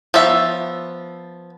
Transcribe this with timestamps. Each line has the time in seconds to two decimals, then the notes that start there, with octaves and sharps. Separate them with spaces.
0.14 F3 B3 C#5 E5